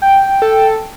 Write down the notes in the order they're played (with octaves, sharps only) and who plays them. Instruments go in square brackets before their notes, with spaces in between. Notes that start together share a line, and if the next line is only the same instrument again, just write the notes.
[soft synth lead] G5
[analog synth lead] A4